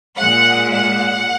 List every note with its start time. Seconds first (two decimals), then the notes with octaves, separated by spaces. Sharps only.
0.18 A#2 G#3 F#5
0.73 F#5